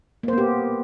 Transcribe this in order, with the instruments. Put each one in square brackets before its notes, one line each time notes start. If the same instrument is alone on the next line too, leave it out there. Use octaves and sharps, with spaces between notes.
[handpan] A#3
C5
B3
G4